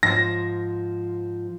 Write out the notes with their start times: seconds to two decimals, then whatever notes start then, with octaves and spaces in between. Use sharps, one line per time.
0.03 G#2 F3 A#6